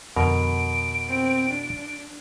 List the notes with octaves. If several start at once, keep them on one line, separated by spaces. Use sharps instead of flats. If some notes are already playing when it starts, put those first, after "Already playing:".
F2 B2 D3 A#4 D7
C4
D4